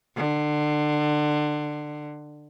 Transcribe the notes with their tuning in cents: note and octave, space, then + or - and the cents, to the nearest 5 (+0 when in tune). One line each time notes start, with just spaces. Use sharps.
D3 +25